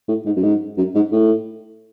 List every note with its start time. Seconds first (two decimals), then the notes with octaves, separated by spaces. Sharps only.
0.08 A2
0.26 G#2
0.36 F#2
0.43 G#2
0.77 F#2
0.95 G#2
1.12 A2